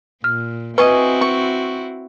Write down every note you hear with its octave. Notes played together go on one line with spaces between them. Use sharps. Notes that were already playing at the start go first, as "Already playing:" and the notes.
A#2 F6
C4 E4 F#4 B4 D#5 G#5 C#6
C#6